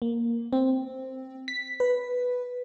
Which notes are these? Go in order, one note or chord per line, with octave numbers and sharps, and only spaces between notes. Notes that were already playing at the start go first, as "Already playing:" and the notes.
A#3
C4
B6
B4